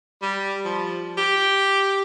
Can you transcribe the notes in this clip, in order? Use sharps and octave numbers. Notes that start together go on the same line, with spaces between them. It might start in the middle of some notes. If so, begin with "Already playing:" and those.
G3
F3
G4